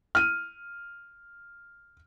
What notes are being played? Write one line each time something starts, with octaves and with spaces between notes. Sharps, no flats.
F6 D#7